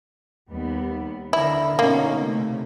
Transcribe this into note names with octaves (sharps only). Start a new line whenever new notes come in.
D#2 G3 B3
D3 E4 A#4
B2 A#3 C#4 D#4
C3 A3